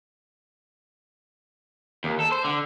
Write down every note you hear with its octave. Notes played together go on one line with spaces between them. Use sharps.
D#2
A4
C5
D3